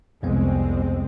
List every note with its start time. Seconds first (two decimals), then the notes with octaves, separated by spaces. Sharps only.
0.23 C2 F2 G#3 B3 C4